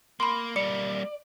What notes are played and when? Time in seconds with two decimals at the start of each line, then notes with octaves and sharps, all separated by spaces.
0.20 A#3 B5 C6
0.56 G3 A#3 D5 C#7